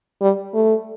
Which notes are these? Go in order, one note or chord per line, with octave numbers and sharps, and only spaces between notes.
G3
A3